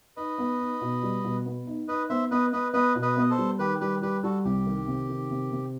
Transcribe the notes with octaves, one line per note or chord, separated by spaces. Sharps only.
D#4 B4 D#5
B3
D#4
B2
G3
B2
B3
D#4
D#4 B4 D#5
B3 C5 E5
B3 B4 D#5
B3 B4 D#5
B3 B4 D#5
B2
B4 D#5
B3 D#5
A4 C5
G3
D#3 G4 B4
G3 G4 B4
G3 G4 B4
G3 F#4 A4
C2 G4
D#3
C3
D#3
C3
C3